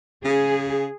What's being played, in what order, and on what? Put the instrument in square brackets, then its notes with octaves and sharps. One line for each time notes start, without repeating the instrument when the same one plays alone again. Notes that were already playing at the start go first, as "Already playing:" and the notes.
[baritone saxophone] C#3 [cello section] G#4